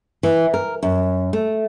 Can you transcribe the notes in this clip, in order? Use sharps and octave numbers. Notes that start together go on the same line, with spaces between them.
E3
A#4
F#2
A3